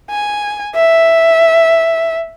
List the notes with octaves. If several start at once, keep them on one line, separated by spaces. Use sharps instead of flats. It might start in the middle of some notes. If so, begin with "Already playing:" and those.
G#5
E5